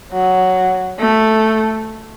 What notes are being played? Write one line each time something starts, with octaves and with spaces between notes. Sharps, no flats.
F#3
A3